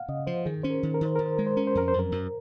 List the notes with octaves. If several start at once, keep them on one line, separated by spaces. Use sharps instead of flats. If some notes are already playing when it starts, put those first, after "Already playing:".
Already playing: F5 F#5
C#3 D#5
F3 C5
D#3 G#4
C#4 C5
A#4
D#3
A#4
D#3 C5
D#3 A#4
C5
G#3 A#4
C5
C#4 A#4
C5
F2 A#4
C5
F#2
A#4
F#2